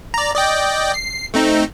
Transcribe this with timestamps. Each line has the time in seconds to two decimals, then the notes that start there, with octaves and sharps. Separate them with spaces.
0.14 D5 A#5
0.35 D5 D#5 G5
0.94 C7
1.34 A3 C4 D#4